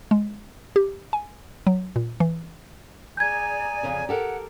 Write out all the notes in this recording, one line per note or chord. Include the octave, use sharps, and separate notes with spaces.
G#3
G4
G#5
F#3
A#2
E3
G#4 D5 G#5 A#5 G6 G#6
F2 C#3 C#5
G4 A4 A#4 F#5